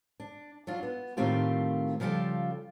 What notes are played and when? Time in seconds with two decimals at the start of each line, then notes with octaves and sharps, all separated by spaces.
0.20 D4
0.67 F#3 D4 F4
0.83 B3
1.17 A2 D#3 A3 C4 F4 G4
2.00 C#3 F3 G3 F4 A4 G5